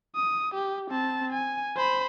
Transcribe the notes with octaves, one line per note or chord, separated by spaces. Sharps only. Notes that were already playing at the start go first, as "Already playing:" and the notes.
D#6
G4
C4 A5
G#5
C5 B5